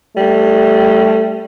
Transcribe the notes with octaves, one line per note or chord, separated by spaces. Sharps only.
G3 A3